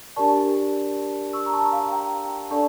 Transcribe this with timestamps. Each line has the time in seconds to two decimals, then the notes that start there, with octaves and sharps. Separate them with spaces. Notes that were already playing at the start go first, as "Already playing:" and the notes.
0.16 D4 G4 A#4 D5 A5 C#6
1.33 C#6 E6
1.46 A#5
1.53 A5 C#6
1.72 F5 A5
1.92 G5 A#5
2.51 D4 A4 D5 A5 C#6